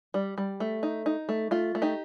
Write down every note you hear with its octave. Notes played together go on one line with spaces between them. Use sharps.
G3
G3
A3
D#4
D#4
A3
A3 F4
A3
D#4 G4